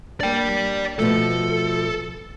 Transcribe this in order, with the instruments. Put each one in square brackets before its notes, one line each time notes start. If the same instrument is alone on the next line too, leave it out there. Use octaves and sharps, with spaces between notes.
[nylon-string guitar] A#3 D4 [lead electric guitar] D5 G5
[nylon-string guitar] B2 F3 A3 [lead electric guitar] A4